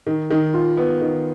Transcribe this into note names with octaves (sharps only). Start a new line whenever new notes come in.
D#3
D#3
F4
B3
D#3